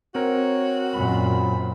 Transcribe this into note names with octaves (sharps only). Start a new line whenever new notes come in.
C4 F#4 A#4 C#5
F#2 A#2 B5